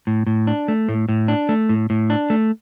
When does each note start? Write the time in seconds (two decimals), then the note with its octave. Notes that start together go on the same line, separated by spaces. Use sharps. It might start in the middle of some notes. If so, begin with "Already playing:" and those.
0.07 A2
0.27 A2
0.47 D4
0.68 A3
0.89 A2
1.09 A2
1.28 D4
1.49 A3
1.69 A2
1.90 A2
2.10 D4
2.30 A3